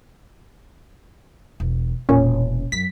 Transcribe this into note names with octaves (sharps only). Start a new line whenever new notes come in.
E1
E1 A#2 C#4
F#2 B6